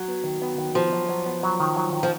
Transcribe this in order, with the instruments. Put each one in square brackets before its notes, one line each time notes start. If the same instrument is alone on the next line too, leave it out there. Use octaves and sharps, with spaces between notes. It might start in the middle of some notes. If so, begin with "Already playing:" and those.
Already playing: [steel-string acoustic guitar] F#3
[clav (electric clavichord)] B3
D#3
B3
D#3
[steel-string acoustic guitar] F3 [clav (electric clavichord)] B3
[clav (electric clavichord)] F#3
F#3
B3
F#3
D#3
F#3
D#3
[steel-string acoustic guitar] F3